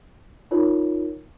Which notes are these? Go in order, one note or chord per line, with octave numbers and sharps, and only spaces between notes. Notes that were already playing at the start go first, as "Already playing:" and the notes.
D#4 F4 A#4 C#5